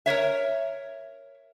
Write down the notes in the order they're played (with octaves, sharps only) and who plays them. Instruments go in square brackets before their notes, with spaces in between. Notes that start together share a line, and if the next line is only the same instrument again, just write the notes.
[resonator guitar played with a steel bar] A#4 C5 C#5 E5